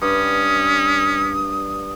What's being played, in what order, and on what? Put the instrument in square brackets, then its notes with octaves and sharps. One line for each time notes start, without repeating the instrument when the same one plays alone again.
[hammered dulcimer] G2 [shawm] C#4 [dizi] D#6